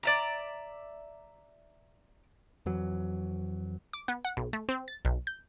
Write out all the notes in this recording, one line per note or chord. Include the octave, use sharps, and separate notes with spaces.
D5 E5 A#5
F2 E3 F#3
D6
B3
F#5
B1
A3
C4
A6
B1
G6